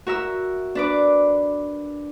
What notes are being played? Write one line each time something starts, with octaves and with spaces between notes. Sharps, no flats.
F#4 A#4 E5 E6
D4 B4 D6